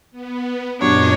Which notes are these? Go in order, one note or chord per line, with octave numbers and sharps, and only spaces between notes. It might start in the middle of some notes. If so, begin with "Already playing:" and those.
B3
F#2 A#2 F#3 G3 B3 D4 C#5 D#5